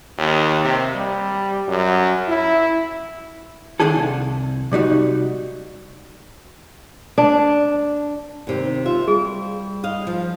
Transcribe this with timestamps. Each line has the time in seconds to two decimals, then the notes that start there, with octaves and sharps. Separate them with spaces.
0.18 D#2
0.64 C3
0.95 G3
1.68 F#2
2.28 E4
3.80 D3 D#3 D4 E4 G#4 A4
3.95 C2
4.72 C3 G3 D#4 F#4
7.18 D4
8.47 D#2 C3
8.86 F4 E5
9.08 G3 G#4
9.83 D#5 F5
10.07 F3